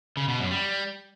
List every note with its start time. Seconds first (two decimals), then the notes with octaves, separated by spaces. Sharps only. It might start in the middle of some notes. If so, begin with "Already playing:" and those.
0.17 C#3
0.28 B2
0.39 F#2
0.51 G3